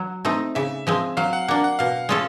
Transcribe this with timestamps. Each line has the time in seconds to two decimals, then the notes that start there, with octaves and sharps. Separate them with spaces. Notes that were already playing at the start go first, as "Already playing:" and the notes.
Already playing: F#3
0.25 A3 C4 D#4
0.55 C#3 E5
0.87 F3 G#3 C4
1.17 F#3 F5
1.33 F#5
1.48 A#3 D4 F#5
1.64 F#5
1.79 B2 F5
2.09 G#3 C#4 F4 A4